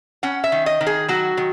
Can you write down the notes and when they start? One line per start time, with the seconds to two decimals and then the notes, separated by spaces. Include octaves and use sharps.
0.23 C#4 F#5
0.44 E5
0.52 D#3
0.66 D#5
0.81 D#3
0.87 G#4
1.08 F#3 F#4
1.37 D#3